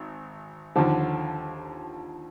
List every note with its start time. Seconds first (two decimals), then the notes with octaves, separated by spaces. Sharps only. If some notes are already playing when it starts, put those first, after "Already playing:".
Already playing: G#1
0.76 D#2 D3 F3